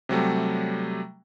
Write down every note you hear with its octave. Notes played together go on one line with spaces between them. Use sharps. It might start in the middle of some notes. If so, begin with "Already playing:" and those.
C3 F#3 G3 A3